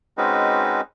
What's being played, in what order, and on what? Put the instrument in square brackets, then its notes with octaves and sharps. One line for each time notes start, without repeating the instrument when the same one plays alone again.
[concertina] G#3 C4 C#4 D#4 F#4 B4